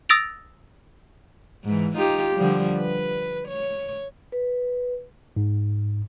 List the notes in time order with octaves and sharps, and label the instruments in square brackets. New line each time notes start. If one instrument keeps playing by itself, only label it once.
[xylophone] D#6 E6 A6 A#6 D7 F7
[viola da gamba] G#2 E3
D#4 F4 G4
D3 F3 G3
B4
C#5
[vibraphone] B4
[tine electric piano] G#2